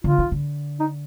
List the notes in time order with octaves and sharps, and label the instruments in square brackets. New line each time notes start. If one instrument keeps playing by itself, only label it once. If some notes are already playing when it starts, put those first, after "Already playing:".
[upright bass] D3 [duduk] F4
[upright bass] D#3
D3
[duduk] D#4